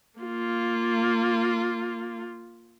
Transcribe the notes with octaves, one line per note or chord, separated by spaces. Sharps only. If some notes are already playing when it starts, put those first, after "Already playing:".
A#3 F4